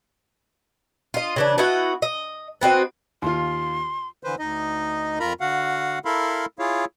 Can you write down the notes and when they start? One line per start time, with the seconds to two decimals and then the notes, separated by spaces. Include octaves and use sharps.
1.14 F4 D#5
1.36 C#3 E3 D4
1.58 B3 E4 F#4 D#5
2.02 D#5
2.61 B3 C4 F#4 D#5
3.22 D#2 F4 C6
4.23 D3 E3 B4 C5
4.39 D2 D#4 D#5
5.20 F2 F4 A#4 A#5 B5
5.41 D3 F#4 F5 F#5
6.05 E4 A4 A#4 F5 B5 C6
6.59 E4 F4 G#4 C#5 F5